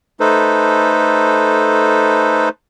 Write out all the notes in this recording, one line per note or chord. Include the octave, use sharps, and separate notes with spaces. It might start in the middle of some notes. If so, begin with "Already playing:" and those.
A3 D#4 A4 B4 C5